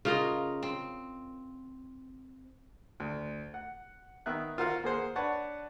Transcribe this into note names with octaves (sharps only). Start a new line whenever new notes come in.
C#3 F4 A#4 D#5
C4
D2
F#5
D#3 B3 E5 F#6
F4 F#4 A#4 C5 F5 F#5
A#3 G#4 C5 F#5
D4 B4 C#5 F#5 A5